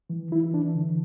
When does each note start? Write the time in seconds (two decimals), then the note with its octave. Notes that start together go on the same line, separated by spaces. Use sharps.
0.10 E3
0.31 E3 E4
0.54 E3 D4
0.75 D3